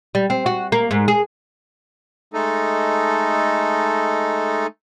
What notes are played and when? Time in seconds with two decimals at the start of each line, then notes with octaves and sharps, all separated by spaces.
0.15 G3
0.30 C4
0.46 F#4
0.72 A#3
0.91 G#2
1.08 G#4
2.34 G#3 A3 D#4 A4